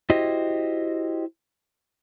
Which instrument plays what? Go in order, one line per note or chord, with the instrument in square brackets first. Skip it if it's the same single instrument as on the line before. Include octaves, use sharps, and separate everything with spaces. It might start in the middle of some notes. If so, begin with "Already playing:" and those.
[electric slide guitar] E4 F#4 G4 C5 D#5